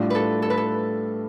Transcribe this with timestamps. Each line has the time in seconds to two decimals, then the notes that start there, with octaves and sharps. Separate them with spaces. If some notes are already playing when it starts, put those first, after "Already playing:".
Already playing: A2 G3 D4 F4
0.10 A4 B4
0.42 A4
0.50 B4
0.57 A4